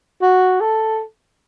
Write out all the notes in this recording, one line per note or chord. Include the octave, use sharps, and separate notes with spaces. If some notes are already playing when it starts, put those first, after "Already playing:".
F#4
A4